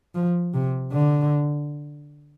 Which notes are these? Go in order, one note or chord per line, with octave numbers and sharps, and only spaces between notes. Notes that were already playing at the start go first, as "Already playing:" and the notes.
F3
C3
D3